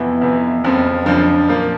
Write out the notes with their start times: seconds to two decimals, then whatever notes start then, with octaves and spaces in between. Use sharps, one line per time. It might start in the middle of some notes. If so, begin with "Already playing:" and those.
Already playing: F2 C3 E3 B3
0.22 F2 C3 E3
0.64 F#1 F2 C#3 F3 C4
1.06 F#1 F2 C#3 F3 D4
1.48 A#2 F3 A#3